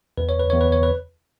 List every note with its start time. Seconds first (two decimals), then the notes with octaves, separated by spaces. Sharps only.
0.17 E2 B4
0.29 C#5
0.40 B4
0.50 E2 C#5
0.61 B4
0.72 C#5
0.83 B4